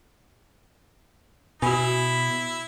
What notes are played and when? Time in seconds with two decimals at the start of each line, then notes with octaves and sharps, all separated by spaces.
1.62 B2 E4 F#4 G#5 B5